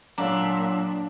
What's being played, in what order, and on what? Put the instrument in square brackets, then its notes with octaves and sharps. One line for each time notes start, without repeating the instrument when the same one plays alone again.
[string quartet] A#2 [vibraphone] F#3 E6 [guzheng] D4 [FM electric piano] C#5 F5 A#5